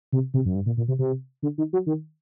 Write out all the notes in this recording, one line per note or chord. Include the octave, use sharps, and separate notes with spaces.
C3
C3
F#2
G2
A#2
A#2
C3
C3
D3
D#3
F#3
D#3